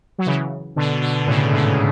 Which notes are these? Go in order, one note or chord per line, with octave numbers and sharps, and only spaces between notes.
F#3
C#3 E3
B2 D3
B2 D3
A2 C#3
G#2 B2